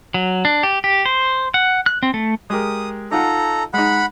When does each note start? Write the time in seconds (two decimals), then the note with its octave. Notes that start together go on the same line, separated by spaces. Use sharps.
0.14 F#3
0.45 D4
0.63 G4
0.84 G4
1.06 C5
1.54 F#5
1.86 F#6
2.03 C4
2.14 A3
2.50 G#3 G4 A#4 D#6
3.11 D#4 F4 A4 F#5 A#5
3.74 G#3 D#4 F#5 B5